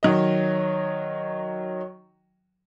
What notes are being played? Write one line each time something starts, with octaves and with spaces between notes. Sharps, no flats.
D#3 F#3 D#5